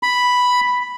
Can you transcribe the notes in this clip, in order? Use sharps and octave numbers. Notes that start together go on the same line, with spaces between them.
B5